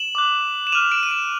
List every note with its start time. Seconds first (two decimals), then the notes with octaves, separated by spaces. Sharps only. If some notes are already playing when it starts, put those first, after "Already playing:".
Already playing: E7 F#7
0.15 D6 F#6
0.67 E7
0.72 D6 F6 D#7 F7
0.92 D7 E7
1.03 D#7
1.11 D7 E7